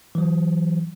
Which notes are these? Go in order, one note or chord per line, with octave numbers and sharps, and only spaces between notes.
E3 F#3